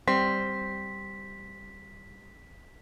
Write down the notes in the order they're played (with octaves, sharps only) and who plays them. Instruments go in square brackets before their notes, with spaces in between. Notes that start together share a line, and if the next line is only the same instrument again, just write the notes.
[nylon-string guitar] G3 [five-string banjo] C4 [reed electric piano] C6 [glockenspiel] B6